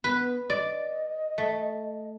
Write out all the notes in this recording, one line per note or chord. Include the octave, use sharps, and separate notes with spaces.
B3 B4
D5 D#5
A3